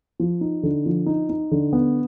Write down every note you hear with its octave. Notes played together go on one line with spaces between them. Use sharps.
F3
D#4
D3
F3
D#4
D#4
D3
B3